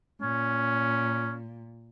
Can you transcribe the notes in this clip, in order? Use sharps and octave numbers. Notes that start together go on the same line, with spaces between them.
A#2 C#4